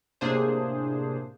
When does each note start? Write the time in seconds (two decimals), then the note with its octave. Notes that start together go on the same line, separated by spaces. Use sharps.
0.21 A2 C3 A#3 D4 G#4 C5